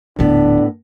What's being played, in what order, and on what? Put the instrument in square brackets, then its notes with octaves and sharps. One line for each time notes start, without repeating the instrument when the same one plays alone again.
[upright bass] D#1 D3 [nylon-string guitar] A2 B3 [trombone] D4